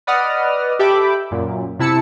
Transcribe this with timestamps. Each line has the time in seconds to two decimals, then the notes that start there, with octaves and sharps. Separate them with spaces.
0.07 B4 D5 D#5 F#5 D#6 F6
0.79 G4 A4 E5 G5 B5 D6
1.31 F#2 A#2
1.79 C3 E4 A5 E6 C#7